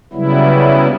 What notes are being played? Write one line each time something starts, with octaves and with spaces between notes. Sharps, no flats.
C#3 F#3 G3 B3 E4